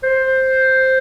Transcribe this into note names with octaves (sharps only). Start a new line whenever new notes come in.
C5